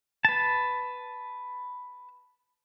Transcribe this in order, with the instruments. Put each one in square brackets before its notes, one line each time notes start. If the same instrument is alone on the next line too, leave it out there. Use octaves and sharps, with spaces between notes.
[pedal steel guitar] B4 A5